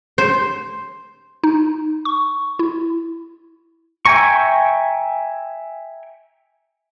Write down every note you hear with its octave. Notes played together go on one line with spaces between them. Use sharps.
C5
D#4
C#6
E4
E5 G5 G#5 A#5 C#6